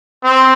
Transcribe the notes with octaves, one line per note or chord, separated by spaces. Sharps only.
C4